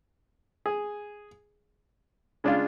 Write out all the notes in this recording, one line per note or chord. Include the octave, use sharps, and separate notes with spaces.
G#4
C#3 G#3 D4 F4